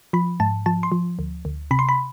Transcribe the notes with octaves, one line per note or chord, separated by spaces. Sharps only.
F3 B5
G#2 A5
F3 A5
C6
F3
D2
D2
C3 B5
C6
B5